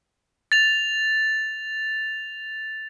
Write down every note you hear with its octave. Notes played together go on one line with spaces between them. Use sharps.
A6 F7